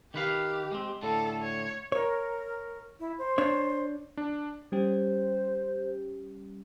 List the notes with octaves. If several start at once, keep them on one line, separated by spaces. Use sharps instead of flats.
D#3 G4 B4 F5
G#3 C4
A2 D3 A4
C#5
A#4 C#5
E4
C5
D4 C#5
D4
G3 C#4 G4 C5